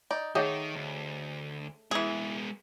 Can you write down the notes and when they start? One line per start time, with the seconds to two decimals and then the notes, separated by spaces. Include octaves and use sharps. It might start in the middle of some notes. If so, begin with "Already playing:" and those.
0.11 D#4 D5
0.35 D#3 A3 G#4 C#5 D#5 F#5 G5
0.75 D2
1.91 E3 G#3 B3 G#4